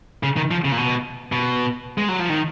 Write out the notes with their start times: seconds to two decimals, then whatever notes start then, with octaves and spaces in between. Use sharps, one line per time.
0.23 C#3
0.36 D#3
0.51 F3
0.64 C#3
0.72 A#2
0.77 B2
1.32 B2
1.98 G#3
2.09 F#3
2.19 F3
2.30 D#3